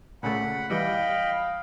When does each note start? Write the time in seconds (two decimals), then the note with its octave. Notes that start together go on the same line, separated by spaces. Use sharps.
0.23 A#2 C#3 A3 F#5 B5
0.70 E3 G3 D#5 F5 G5 B5